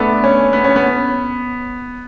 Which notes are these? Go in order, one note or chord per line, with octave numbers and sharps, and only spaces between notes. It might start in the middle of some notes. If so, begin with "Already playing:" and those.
Already playing: A3 B3 D4
C#4
B3
C#4
B3